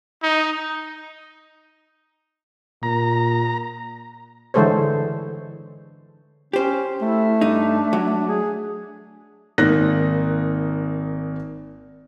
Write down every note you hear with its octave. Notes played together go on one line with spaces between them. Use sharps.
D#4
A#2 A#5
D3 E3 G#3 A4 C5 C#5
C#4 G4 C5
A3 E4
G2 D4 D#4
F#3
G#4
G#1 A#3 D#4 F#6 A#6